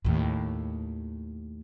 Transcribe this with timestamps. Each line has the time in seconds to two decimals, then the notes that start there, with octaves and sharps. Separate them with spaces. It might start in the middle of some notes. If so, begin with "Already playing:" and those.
0.05 D#2 A2